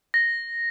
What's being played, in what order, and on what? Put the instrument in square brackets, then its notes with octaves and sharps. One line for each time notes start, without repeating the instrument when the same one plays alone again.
[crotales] A#6